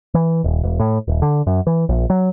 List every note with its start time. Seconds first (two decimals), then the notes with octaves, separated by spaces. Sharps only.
0.14 E3
0.44 D#1
0.63 E1
0.80 A2
1.08 D#1
1.22 D3
1.47 F#2
1.67 E3
1.89 A#1
2.10 F#3